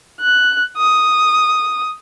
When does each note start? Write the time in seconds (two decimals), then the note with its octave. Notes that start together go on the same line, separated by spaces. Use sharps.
0.21 F#6
0.78 D#6